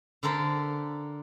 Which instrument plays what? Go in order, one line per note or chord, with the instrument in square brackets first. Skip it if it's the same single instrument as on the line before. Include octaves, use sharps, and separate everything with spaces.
[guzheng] D3 A4 A#4 C5 B5